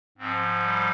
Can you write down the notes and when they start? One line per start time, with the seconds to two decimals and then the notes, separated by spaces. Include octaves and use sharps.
0.18 G#2 F3 C4
0.63 G3